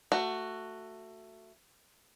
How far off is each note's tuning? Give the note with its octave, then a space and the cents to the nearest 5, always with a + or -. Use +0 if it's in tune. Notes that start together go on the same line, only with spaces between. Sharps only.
A3 +15 F#4 +0